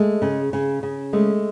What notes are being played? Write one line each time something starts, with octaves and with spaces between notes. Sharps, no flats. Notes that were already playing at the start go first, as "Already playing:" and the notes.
Already playing: G#3 A3
C#3
C#3
C#3
G#3 A3